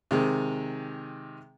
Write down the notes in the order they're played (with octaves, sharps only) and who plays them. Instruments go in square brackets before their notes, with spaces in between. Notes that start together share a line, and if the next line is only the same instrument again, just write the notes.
[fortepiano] C3 D#3 G#3